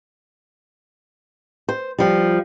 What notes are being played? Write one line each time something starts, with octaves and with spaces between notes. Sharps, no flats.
C5
F3 G3